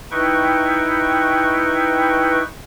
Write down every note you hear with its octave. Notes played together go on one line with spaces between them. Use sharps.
D#4 E4 B4 G5 C#6